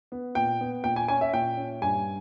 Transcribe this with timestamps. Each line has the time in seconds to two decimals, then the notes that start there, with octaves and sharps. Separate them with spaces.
0.12 B3
0.35 A#2 G5
0.61 B3
0.84 A#2 G5
0.96 G#5
1.08 C#4 G#5
1.21 E5
1.33 A#2 G5
1.57 C#4
1.82 G2 G#5